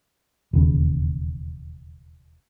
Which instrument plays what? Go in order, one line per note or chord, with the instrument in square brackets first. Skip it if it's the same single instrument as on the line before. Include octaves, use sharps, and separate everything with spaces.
[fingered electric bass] E1 D#2 C#3